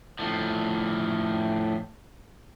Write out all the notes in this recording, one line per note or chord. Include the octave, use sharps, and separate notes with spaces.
A2 F3